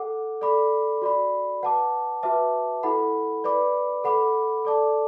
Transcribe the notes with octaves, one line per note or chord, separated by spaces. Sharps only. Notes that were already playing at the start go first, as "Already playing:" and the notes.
Already playing: A4 F#5 D6
A4 D5 B5 D6
F#4 D5 B5
B4 F#5 A5 D6
F#4 B4 E5 A5 D6
E4 A4 F#5 B5
B4 D5 B5 D6
A4 F#5 B5 D6
A4 D5 A5 D6